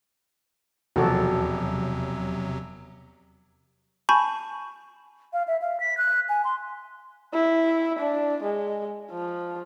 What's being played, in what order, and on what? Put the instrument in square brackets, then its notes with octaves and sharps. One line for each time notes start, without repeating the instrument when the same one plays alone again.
[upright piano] E1 [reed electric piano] D#2 F3 D6 [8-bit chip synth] C3 F#3 [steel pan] F#4 A4
[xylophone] G#5 A5 B5 C#6 G6
[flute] F5
E5
F5
B6
F#6
G#5
C6
[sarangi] E4
D4
G#3
F3